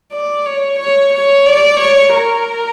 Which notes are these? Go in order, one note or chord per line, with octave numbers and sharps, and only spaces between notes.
D5
C#5
C#5
C#5
D5
C#5
A#4